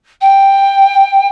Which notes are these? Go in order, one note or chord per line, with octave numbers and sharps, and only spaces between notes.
G5